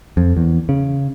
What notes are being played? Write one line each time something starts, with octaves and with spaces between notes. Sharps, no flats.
F2
E2
C#3